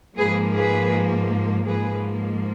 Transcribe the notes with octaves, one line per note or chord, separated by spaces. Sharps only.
G#2 F3 A#3 G#4 B4
G#4 B4
G#2 F3 A#3 G#4 B4